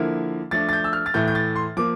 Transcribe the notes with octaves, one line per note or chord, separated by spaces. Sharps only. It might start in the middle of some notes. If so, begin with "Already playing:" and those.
Already playing: D3 F3 A#3 E4
F3 A3 D4 A6
A6
G6
E6
F6
A6
A2 E3 A3 G6
G6
A6
C6
F3 A#3 D6